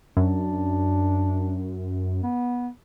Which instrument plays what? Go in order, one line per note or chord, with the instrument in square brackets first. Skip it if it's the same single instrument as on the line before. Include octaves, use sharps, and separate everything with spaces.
[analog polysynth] F#2 [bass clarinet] D4
[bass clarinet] B3